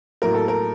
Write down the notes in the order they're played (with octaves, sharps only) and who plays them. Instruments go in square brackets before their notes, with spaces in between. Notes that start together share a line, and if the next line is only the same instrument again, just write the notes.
[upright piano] A2 F#3 A#3 A#4
A4
A#4